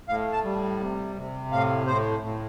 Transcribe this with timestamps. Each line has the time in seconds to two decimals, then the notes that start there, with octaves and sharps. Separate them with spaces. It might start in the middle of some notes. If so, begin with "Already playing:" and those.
0.08 A2 F5
0.33 A5
0.44 G3
0.80 C3
1.16 C3
1.52 A2 F5
1.87 A2 C5
2.22 A2